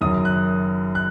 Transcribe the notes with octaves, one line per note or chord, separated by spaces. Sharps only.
F#1 F#2 D#3 F#3 D#6
F#6
F#6